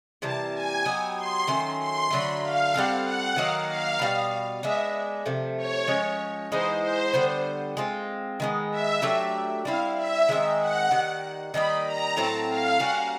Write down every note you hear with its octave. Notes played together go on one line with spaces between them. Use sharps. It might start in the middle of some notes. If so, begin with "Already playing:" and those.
C3 E3 G3 A#3 A5
G#5
F#3 B3 D#4 G4
C6
D#3 F#3 A3 C#4
C6
D3 F#3 A3 B5
F5
G3 C4 F4 A4 F#5
F#5
D#3 F#3 A#3 D#4 F5
F5
B2 G3 B3
G#3 B3 D4 E5
C3 F3 A3
C#5
F3 G#3 C#4
E3 G#3 B3 D#4 C5
C5
D3 G3 B3
G#3 C4 F4
D#3 G#3 B3
E5
F#3 A3 D4 G4
G3 C4 E4 F5
E5
D#3 G#3 C4 D#4
F#5
D#3 G3 A#3
D#3 G3 A#3 D#4 B5
A#5
A2 F#3 A3 C4 A5
F5
G3 A#3 C#4 F#4 F#5